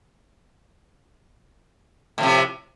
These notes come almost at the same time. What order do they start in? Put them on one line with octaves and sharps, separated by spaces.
A2 F3 C3